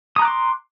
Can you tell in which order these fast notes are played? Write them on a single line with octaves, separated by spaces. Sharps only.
D#6 A#5 F#6 D6 C6